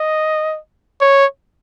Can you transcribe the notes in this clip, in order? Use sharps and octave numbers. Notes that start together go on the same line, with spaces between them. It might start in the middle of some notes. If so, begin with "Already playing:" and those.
Already playing: D#5
C#5